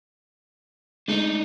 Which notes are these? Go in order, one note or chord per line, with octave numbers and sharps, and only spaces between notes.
G#3 A3 C4 D4 D#4